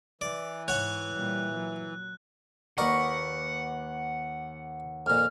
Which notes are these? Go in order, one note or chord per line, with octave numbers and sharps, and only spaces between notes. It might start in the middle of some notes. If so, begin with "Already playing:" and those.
E3 D5
G#2 C#5 F#5 F#6
A#2 G3
F#3
D#2 A#4 B4 D5 D#5 F#5 C#6
F2 A#2 F6